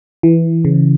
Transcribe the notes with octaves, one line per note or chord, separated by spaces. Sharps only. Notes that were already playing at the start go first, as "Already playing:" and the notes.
E3
C#3